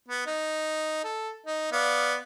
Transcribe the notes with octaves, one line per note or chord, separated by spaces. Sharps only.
B3
D#4
A4
D#4
B3 D5 F5